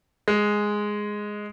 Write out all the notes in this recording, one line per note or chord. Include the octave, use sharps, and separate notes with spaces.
G#3